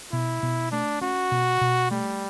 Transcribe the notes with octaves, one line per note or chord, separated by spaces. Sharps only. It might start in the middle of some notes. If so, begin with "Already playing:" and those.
B2 E4
B2
A3 D4
C#4 F#4
B2
B2
G3 A3